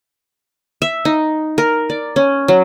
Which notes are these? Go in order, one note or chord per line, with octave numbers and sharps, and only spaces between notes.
E5
D#4
A#4
D5
C#4
F#3